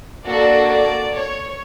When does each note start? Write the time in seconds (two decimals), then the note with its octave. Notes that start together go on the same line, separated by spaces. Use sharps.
0.25 A#3 D4 F#4 A4 D5
0.69 D5
1.14 C#5